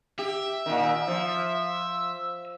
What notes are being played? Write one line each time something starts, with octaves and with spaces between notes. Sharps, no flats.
G4 E5
A#2 D#3
F3